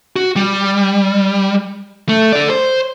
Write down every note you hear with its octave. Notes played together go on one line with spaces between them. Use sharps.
F#4
G3
A3
A4 D5
C5